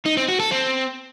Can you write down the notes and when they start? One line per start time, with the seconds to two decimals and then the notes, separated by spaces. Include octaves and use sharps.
0.06 D#4
0.17 C4
0.28 F#4
0.40 A4
0.51 C4